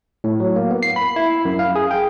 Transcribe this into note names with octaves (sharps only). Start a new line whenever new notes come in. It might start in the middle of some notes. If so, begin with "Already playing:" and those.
A2
F#3
A#3
B3
C7
B5
E4
F#2
F5
G#4
G5